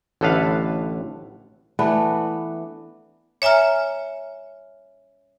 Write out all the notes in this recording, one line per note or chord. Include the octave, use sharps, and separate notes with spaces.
A1 A2 D3 A4 B4 F5
E3 A3 B3 D4
C#5 E5 G#5 A#5 F6